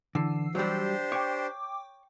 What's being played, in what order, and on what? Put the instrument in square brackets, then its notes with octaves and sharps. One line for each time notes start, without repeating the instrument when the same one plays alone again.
[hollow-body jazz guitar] D3 [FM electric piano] E3 E6 C7
[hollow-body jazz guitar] F#3 G3 [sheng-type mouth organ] D4 G4 C5
[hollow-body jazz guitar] C#5 [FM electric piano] G5 D6